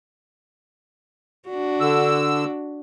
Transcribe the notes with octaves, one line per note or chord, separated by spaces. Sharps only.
D4 F#4
D3 E6